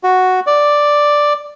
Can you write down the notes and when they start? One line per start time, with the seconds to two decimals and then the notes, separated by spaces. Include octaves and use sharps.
0.03 F#4
0.47 D5